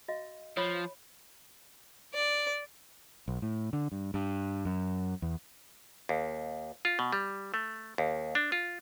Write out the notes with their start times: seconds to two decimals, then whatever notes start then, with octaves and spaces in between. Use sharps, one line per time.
0.08 F#4 D#5 F5
0.57 F3 C#5 B5
2.14 D5
3.28 B1
3.42 A2
3.73 D3
3.92 G2
4.14 G2
4.65 F#2
5.22 E2
6.09 D#2
6.85 F4
6.99 B2
7.13 G3
7.54 A3
7.98 D#2
8.35 D4
8.52 F4